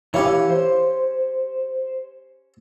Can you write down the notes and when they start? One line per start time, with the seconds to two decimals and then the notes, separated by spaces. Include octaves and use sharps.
0.14 E3 C#4 G4 C#5 F5 E6
0.50 C5